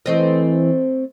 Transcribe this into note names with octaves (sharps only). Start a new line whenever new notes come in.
E3 A3 C4 D#5